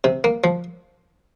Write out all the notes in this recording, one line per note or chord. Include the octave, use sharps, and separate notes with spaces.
C3
A#3
F3